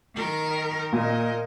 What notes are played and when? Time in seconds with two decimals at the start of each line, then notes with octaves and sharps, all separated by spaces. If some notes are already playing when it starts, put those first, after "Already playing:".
0.15 D#3 A#4
0.92 A#2 A#4 D#5